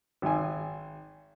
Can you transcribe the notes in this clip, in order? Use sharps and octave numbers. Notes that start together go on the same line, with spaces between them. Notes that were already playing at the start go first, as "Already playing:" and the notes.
G#1 G#5